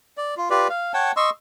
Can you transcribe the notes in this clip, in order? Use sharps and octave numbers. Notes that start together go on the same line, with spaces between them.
D5
F4
F4 G4 B4 D5
F5
C#5 F#5 G5 A5
D#5 C6 C#6 E6